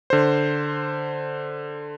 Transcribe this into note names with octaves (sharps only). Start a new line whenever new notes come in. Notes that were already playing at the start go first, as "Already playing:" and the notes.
D3 C5